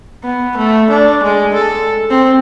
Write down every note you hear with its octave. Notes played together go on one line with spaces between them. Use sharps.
B3
A3
D4
G#3
A4
C4